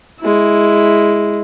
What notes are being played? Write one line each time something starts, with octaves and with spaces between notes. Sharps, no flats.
G#3 E4